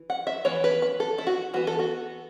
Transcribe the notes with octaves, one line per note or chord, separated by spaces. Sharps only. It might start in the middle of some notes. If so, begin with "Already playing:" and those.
Already playing: E3
F#5
E5
E3 B3 C#5
B4
B4
A4
E4
F#4
E3 B3 F#4
A4
F#4